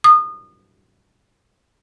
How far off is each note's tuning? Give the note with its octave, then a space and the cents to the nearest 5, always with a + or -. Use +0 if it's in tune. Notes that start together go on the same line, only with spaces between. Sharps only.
D#6 -30